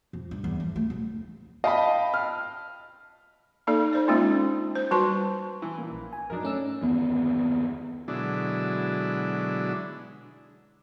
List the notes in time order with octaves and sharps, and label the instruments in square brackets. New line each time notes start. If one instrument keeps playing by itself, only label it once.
[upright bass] F2
G2
E2
F3
A3
D1
[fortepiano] D#5 G5 [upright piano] F5 A5 B5
[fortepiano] F6
[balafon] A#3 D#4 A4 D5
D#4 C5 D5
G#3 A#3 C#4 D4 F4
C5
G3 F#4 B4 A5 C6
[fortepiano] E3
A#2
[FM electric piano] A#1
G#5
[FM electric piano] F2 G#2 F#3 [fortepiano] D4 D#4 A#4
[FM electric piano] A3 C#4 E6
[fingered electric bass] G1 E2 D#3 B3
[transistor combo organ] B2 D3 F#3 G#3 D4 E4